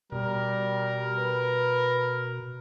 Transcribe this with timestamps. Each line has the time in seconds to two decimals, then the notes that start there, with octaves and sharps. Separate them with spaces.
0.12 B2 G3 A#4
1.18 B4